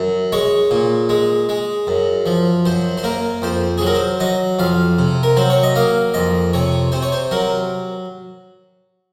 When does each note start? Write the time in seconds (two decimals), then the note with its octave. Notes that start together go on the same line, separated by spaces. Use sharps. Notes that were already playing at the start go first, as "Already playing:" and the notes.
Already playing: F#2
0.32 G#3 C#5
0.71 A#2
1.09 G#3
1.49 G#3
1.87 F#2
2.26 F3
2.65 F#2 C5
2.97 C5
3.04 A#3 A#4
3.42 F2 C5
3.78 F#3 G#4
3.86 A#4
3.95 C5
4.20 F#3 D#5
4.59 F2 F5
4.99 C3
5.23 A#4
5.36 F#3 C5
5.50 C#5
5.63 D#5
5.76 A#3 F5
6.14 F2 D#5
6.53 C3 C#5
6.92 C3 C5
7.03 C#5
7.12 C5
7.31 F#3 A#4